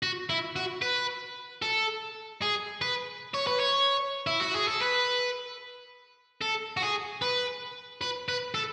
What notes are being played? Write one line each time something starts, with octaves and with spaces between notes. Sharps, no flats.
F#4
E4
F#4
B4
A4
G#4
B4
C#5
B4
C#5
E4
F#4
G#4
A4
B4
A4
F#4
G#4
B4
B4
B4
A4